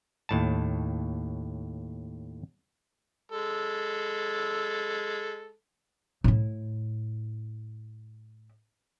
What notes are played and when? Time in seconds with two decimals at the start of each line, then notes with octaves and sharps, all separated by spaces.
0.29 D#2 A2 A5
3.32 G#3 A4
6.24 A2 E4